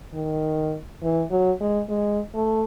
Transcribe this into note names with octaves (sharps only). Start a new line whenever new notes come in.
D#3
E3
F#3
G#3
G#3
A3